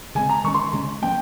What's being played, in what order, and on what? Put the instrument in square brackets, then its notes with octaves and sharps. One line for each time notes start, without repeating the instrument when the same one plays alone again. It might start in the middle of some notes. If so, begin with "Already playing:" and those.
[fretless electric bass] C#3 G#3 C4 [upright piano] G#5
[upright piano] A#5
[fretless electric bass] D#3 G#3 C#4 [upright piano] C#6
[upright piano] C6
[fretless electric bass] C#3 G#3 C#4
[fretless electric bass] F3 A#3 C#4 [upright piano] G5